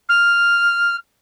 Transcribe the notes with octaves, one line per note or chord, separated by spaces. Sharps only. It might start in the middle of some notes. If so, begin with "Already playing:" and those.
F6